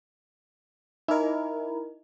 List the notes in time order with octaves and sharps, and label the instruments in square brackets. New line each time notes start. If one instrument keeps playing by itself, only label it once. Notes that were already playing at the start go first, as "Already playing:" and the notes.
[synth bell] D#4 D#5 [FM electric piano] E4 A#4